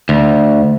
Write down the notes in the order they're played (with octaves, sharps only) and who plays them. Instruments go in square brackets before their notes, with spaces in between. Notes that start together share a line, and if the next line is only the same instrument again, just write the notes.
[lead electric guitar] D2